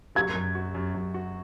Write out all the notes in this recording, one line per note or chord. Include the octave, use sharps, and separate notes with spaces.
F#3 G#6
F#2
F#4
F#2
F#2
F#4